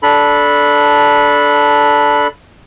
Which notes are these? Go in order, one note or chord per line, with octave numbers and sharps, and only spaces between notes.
D4 A4 B5